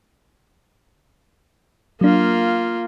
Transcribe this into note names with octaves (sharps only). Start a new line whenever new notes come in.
F#3 A#3 D4 F4